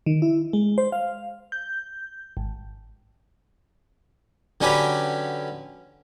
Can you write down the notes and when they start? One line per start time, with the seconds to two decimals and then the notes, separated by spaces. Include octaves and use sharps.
0.06 D#3
0.22 E4
0.53 G#3
0.78 C5
0.92 F5
1.52 G6
2.37 G#1
4.61 D3 F#3 C#4 G4 B4